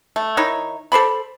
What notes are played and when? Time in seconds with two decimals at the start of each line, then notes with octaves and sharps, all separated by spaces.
0.16 A3
0.37 D#3 D#4 E4 C#5
0.92 A4 C5 D5 B5